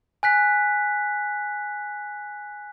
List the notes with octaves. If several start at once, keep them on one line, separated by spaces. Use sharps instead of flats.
G#5 F#6 B6